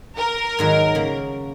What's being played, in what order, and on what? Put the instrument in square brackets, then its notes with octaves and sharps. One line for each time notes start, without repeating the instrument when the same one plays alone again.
[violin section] A#4
[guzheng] G#2 D#3 F#3
C#3 A#3